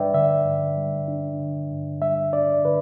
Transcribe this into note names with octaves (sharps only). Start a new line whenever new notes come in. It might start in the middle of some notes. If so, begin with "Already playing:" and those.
Already playing: G2 G3 D4 B4 D5 E5 G5
D3 E5
G2
G3
D4
D3
G2
G3 E5
D4 D5
D3 B4